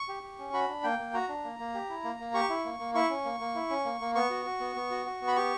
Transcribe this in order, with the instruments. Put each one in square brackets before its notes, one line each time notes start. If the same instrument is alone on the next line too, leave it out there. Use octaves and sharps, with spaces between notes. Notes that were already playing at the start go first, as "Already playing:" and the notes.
Already playing: [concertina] C#6
G4
G4
C#4
F#4 B5
D4
A#3 G5
A#3
F#4 A#5
D4
A#3
A#3
G4
E4
A#3
A#3
G4 C#6
E4
A#3
A#3
E4 C#6
C#4
A#3
A#3
E4
C#4
A#3
A#3
B3 C#6
F#4
F#4
B3
B3
F#4
F#4
B3
B5
G4 C#6